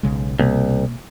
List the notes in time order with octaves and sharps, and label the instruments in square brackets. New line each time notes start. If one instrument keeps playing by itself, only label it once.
[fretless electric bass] B1 C#3 G#3
[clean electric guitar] C2 [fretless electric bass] B2 A#3 B3